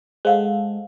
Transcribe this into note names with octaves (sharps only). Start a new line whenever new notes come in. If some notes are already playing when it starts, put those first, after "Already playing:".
G#3 A4 C5 F5 F#5